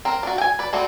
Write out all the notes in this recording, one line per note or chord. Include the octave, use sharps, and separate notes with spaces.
C4 A#4
D4 F#4
G5 G#5
B4 D5
G3 A3 C4 F#4